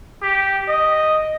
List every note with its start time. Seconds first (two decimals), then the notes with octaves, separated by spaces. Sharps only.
0.22 G4
0.69 D#5